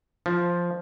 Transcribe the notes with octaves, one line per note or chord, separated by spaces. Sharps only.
F3